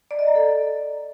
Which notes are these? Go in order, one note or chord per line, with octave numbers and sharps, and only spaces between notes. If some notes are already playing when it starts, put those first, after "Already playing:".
D5
D#5
A#5
A4